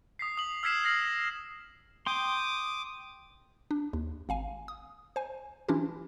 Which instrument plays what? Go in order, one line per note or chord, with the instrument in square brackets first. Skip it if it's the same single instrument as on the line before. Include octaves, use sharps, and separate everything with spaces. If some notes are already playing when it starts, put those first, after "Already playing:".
[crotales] D#6 B6 C7
D#6 F#7
E6 F6 G#6 B6 C7 E7
F6 A#6 C7 F#7
[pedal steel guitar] G5 C6 [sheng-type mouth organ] D6 D#6
[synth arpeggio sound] D4
D#2
G#1 F5 G#5
D#6
C5 G#5
E3 C#4 D4 E4 F4 G4